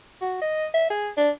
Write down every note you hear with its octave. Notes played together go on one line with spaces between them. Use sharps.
F#4
D#5
E5
G#4
D4